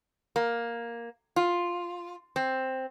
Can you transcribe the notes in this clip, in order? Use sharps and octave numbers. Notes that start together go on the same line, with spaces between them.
A#3
F4
C4